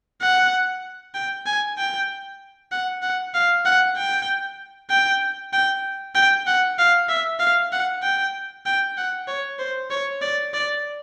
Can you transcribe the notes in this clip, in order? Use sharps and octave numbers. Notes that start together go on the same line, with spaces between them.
F#5
G5
G#5
G5
F#5
F#5
F5
F#5
G5
G5
G5
G5
F#5
F5
E5
F5
F#5
G5
G5
F#5
C#5
C5
C#5
D5
D5